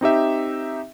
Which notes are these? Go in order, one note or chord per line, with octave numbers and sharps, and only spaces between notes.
C4 D#4 G4 E5